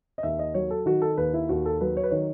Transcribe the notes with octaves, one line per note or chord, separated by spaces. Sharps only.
D#5
D#2 E5
D#5
F#3 C#5
A4
D#3 F#4
A4
D#2 B4
E4
D#2 F#4
A4
F#3 B4
C#5
B4
D#3 C#5